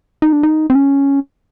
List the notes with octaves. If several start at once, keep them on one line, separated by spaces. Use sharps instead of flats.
D#4
D4
D#4
C4
C#4